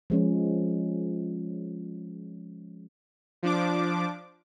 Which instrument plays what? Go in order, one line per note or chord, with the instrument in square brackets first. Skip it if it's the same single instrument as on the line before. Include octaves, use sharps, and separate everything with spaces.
[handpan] F3 G#3 C#4
[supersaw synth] F3 D4 D6